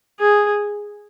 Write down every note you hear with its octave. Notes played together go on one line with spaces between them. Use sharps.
G#4